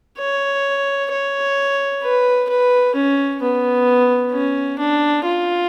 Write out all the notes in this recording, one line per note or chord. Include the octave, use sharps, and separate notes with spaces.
C#5
C#5
B4
B4
C#4
B3
C#4
D4
F4